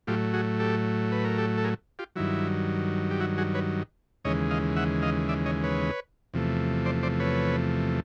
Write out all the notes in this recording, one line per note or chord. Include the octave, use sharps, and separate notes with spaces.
A2 F#3 A3 F4 G4
F#4 G#4
G4 A4
B4
A#4
G4 A4
A4
G#4 A#4
F4 G4
G2 D#3 F#3 E4
G4
E4 F#4
F#4 G#4
B4 C#5
D#2 C#3 E3 G#3 C#5 D#5
D#5 F5
E5 F#5
D#5 F5
D5 E5
C#5 D#5
B4 C#5
E2 C3 F3 A3
C5 D5
C5 D5
B4 C#5